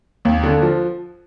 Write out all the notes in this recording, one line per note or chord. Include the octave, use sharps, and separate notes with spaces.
D#2
D3
F3